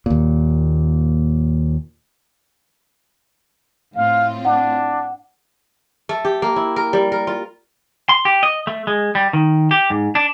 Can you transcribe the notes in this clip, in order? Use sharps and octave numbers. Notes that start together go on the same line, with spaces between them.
D#2 A#2
A2 C4 F4 F5
D4 F#5
A3
G4
A#3
E4
A#4
G3
A#4
F4
C6
G4
D#5
A3
G#3
G3
D#3
G4
G#2
D4